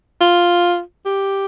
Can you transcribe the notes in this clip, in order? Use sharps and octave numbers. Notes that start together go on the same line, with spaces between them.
F4
G4